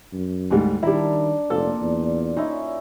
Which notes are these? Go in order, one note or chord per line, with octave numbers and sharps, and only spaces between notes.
F#2
D2 G#2 G3
D#3 G3 D4 E4 A#5
F1 A#2 A4
E2
C#4 D#4 E4